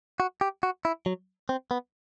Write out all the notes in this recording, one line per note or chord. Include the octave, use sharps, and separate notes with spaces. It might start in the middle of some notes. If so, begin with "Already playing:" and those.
F#4
G4
F#4
E4
F#3
C4
B3